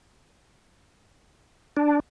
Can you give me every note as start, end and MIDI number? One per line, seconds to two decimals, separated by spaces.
1.77 2.00 62